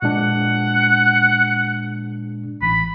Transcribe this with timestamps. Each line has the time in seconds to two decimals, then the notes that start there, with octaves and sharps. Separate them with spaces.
0.02 A#2 G#3 D4 F#5
2.62 A1 B5